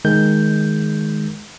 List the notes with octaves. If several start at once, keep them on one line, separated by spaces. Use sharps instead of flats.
D#3 G#3 G6